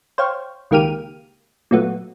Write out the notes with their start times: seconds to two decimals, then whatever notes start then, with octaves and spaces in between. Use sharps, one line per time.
0.18 C5 C#5 F5 G5
0.71 C#2 D#3 A#3 G4 F6 D#7
1.71 A#2 F#3 A3 B3